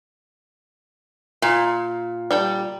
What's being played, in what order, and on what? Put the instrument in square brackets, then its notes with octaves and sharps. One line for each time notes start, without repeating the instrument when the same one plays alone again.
[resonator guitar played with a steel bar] A#2
[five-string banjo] G3 A4 G5